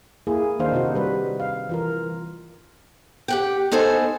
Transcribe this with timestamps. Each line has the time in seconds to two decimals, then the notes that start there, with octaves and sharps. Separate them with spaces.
0.27 A#3 E4 G#4
0.59 D#3 A#3 D4 D#4 C5 F5
0.72 C3 C4 D#4 F#4
0.95 G3 B4
1.40 F5
1.69 E3 F4 A#4
3.28 G4 F#5 G5
3.71 B3 D#4 A4 C5 G#5